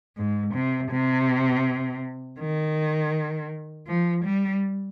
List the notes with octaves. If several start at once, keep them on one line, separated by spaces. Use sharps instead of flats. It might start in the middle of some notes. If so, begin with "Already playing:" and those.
G#2
C3
C3
D#3
F3
G3